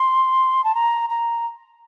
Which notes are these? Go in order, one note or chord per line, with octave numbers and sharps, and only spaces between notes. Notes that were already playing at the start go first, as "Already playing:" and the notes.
Already playing: C6
A5
A#5
A#5